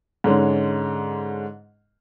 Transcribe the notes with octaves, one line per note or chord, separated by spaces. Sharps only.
G#2 D3 G#3 C#4